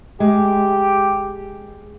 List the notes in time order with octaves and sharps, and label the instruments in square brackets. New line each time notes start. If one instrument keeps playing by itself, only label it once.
[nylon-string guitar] G#3 [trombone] G4